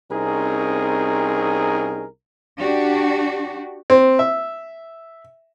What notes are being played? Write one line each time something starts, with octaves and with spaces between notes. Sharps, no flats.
C2 C4 C#4 D#4 G#4 A#4
D4 F#4 G4
C4
E5